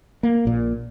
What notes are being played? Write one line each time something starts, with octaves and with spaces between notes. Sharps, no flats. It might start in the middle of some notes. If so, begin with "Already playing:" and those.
A#3
A#1 A#2